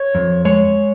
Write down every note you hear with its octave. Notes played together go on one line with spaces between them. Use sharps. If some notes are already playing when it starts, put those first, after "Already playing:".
Already playing: C#5
F2
G#3 C#5